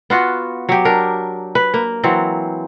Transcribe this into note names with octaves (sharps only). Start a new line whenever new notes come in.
B3 F4 F#4
F#3 G4
D4 A#4
B4
A#3
E3 F#3 C4